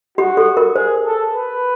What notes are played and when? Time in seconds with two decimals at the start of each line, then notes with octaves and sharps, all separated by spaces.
0.18 F#4 G4
0.37 A4
0.57 A#4
0.76 G#4 C5
1.05 A4
1.34 B4